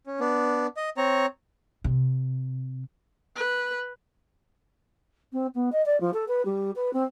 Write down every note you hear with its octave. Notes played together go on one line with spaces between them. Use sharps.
C#4
B3 D4
D#5
C4 C#5 A#5
C3
B4
C4
B3
D#5
D5
F3
A4
B4
G3
B4
C4